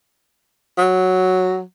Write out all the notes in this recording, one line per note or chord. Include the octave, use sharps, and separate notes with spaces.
F#3